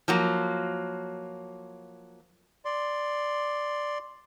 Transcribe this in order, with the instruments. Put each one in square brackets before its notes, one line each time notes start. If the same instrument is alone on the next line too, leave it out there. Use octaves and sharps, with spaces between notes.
[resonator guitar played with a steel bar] F3 F#3 A#3
[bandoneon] D5 C6